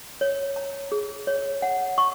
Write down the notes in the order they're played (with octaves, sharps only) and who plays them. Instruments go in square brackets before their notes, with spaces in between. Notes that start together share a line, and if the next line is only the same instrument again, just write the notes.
[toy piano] C#5
A#5
G#4
C#5
F#5
C#6